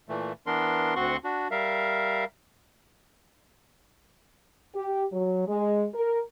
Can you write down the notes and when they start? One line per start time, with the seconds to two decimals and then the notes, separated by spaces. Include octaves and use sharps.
0.09 A#2 E3 A3
0.47 E3 B3 D4 A#4 C6
0.96 D2 C4 F#4 F#5 C6 C#6
1.24 D4 F#4
1.51 G3 A#4 E5 F5
4.75 G4
5.12 F#3
5.47 G#3
5.94 A#4